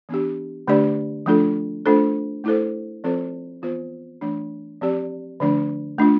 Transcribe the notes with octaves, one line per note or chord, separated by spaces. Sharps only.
E3 B3 D4 G4
D3 A3 D4 G4 D5
F3 A3 D4 F4 A4
A3 D4 F4 A4 C5
A3 E4 A4 C5
F3 C4 F4 A4 C5
E3 B3 F4 C5
E3 A3 D4
F3 C4 G4 D5
D3 F3 A3 D4
A3 D4 F4